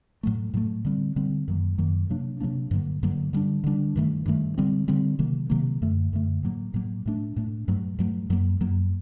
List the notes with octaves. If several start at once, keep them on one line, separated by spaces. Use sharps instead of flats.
A2 F#3 A3
A2 F#3 A3
D3 G3 C4
D3 G3 C4
F#2 D#3 F#3 A#3
F#2 D#3 F#3 A#3
C3 F#3 A#3 D4
C3 F#3 A#3 D4
G2 D3 F#3 A#3
G2 D3 F#3 A#3
D3 G3 D4
D3 G3 D4
G2 D#3 A3
G2 D#3 A3
D3 G3 C4
D3 G3 C4
C3 D#3 F#3 A#3
C3 D#3 F#3 A#3
F#2 D3 A3
F#2 D3 A3
A2 F#3 A#3
A2 F#3 A#3
A2 A3 D4
A2 A3 D4
G2 F#3 A3
G2 F#3 A3
F#2 F#3 A#3
F#2 F#3 A#3